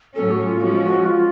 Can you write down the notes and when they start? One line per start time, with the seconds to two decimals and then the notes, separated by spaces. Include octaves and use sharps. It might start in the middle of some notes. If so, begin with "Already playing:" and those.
0.16 A2 F#3 C#4 A4
0.31 F#4
0.46 F4
0.60 F3 G#3 C#4 F#4
0.83 F#4
1.06 F4